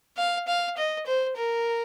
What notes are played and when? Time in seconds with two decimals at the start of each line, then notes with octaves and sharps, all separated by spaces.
0.17 F5
0.48 F5
0.77 D#5
1.06 C5
1.36 A#4